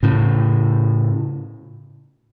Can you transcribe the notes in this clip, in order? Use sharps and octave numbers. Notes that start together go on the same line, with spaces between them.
A2 C#3